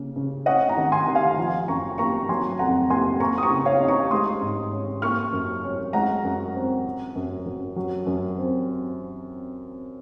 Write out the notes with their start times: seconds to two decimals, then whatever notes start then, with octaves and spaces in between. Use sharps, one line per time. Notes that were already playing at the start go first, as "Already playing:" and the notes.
Already playing: C#3 A#3
0.16 C#3
0.46 C#4 D#5 F#5
0.69 F#5 A#5
0.77 D#3
0.92 G#5 C6
1.07 D#3
1.15 F5 G#5
1.38 F3
1.68 F#2 A#5 C#6
1.98 A#3 A#5 C#6
2.29 F#3 G#5 C6
2.59 F2 F#5 A#5
2.90 A#3 G#5 C6
3.20 A#3 A#5 C#6
3.38 D#6
3.43 A#5 C#6
3.51 C#3
3.66 C#5 F5
3.81 D#4
3.88 A#5 C#6
4.11 G#3 C6 D#6
4.42 G#2
4.72 C#4
5.02 A#3 C#6 F6
5.33 F#2
5.64 C#4
5.93 G#3 F#5 A#5
6.24 F#2
6.55 C4
6.85 C4
7.16 F#2
7.46 F#2
7.76 F#3
8.06 F#2
8.37 C4